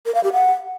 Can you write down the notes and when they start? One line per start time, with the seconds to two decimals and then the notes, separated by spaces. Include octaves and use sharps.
0.06 A#4
0.15 F5
0.24 G4
0.33 F#5